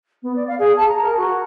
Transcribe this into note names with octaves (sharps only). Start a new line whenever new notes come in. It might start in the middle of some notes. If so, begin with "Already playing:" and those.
B3
D5
F5
G#4
A5
A#5
A#4
F#4